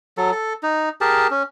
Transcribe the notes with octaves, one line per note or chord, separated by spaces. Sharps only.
F#3 A4
A4
D#4
G4 G#4 A#4 A5
C#4